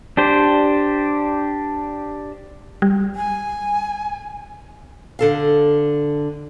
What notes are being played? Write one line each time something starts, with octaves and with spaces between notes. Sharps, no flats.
D4 G4 C5
G3
G#5
D3 A4 F5